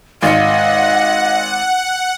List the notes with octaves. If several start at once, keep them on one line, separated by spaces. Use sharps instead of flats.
G#1 D#5 F5 F#5 C#7